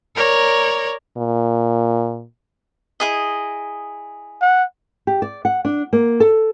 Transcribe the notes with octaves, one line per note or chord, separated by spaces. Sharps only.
A#4 C#5 D5 A#5
A#2
E4 G#4 D#5
F#5
G4
D5
F#5
D4
A#3
A4